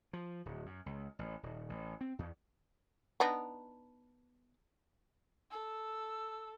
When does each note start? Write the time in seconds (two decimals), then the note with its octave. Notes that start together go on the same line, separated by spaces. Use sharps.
0.13 F3
0.45 D1
0.66 F#2
0.86 C#2
1.19 A1
1.43 D#1
1.69 A1
2.01 C4
2.19 E2
3.20 B3 D4 D#4
5.51 A4 E6